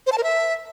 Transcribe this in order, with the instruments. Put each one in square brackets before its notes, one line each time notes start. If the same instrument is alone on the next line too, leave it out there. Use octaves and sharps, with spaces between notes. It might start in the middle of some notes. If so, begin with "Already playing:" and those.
[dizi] C5
A5
A#4
E5